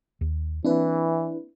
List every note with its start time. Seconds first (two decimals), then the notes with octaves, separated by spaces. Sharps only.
0.21 D#2
0.64 E3 A#3 C4 D4 E4 B4